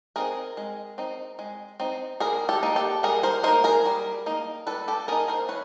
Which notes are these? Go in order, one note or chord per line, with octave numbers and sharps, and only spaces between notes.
C4 D#4 G#4 A#4
G#3
C4 D#4
G#3
C4 D#4
G3 G#4 A#4
G4 A4
A#3 D#4
G4 A4
G3 G#4 A#4
A#4 C5
A#3 D#4 A#4 C5
G#4 A#4
G3
A#3 D#4
G3 A4 B4
G4 A4
A#3 D#4 G#4 A#4
A#4 C5
E3 B4 C#5